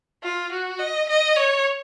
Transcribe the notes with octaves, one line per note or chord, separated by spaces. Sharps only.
F4
F#4
D#5
D#5
C#5